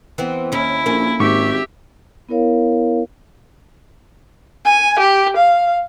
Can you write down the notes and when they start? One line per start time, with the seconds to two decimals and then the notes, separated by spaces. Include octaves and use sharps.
0.18 E3 B3 C4
0.52 D#2 C#4 E4
0.86 A#1 A#3 C#4
1.20 G#1 G#2 G4 E5 C#6 D6
2.29 B3 E4 A#4 C#5 F5
4.65 G#5
4.99 G4
5.37 F5